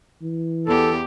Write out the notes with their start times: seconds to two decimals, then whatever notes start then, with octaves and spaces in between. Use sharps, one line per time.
0.22 E3
0.67 E2 G4 A4